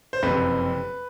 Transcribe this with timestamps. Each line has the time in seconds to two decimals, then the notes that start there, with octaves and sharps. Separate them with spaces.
0.13 C5
0.23 F#1 F2 C3 B4